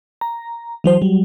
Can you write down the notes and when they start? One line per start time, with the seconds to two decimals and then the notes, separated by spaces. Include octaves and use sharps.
0.21 A#5
0.84 E3 F#3 C5
1.02 F#3 G3